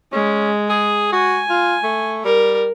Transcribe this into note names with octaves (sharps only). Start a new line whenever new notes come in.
G#3 C#4
G#4
F#4 G#5
F4
A3
G3 A#4